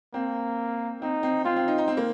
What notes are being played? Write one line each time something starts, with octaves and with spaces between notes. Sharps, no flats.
A#3 C4
C4 D#4
C4
C4 F4
C4
D#4
D#4
C4
A#3